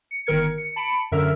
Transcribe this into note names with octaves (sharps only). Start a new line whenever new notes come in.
C#7
G1 D#3 A#4 G#6 C#7
C#7
A5 B5 C#7 D7
F#2 D3 A#4 E5 E6 F6